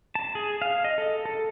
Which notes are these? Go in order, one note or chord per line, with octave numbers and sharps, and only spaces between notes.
A5
G#4
F5
D#5
A4
A4